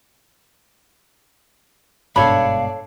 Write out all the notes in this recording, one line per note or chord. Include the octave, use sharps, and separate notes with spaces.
G1 G#2 B2 D4 A4 C#5 F5 B5